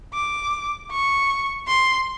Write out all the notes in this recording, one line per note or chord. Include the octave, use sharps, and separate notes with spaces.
D6
C#6
C6